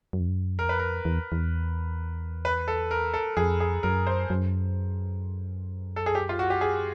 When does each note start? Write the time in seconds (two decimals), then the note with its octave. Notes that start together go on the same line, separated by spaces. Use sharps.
0.13 F#2
0.20 F2
0.28 F#2
0.59 F2 A#4
0.69 B4
0.79 A#4
1.05 E2
1.32 E2
2.45 B4
2.68 A4
2.91 A#4
3.14 A4
3.37 F2 G#4
3.60 G#4
3.83 F#2 A#4
4.07 C5
4.30 F#2
5.96 A4
6.06 G#4
6.15 G4
6.29 F4
6.39 F#4
6.50 G4
6.61 G#4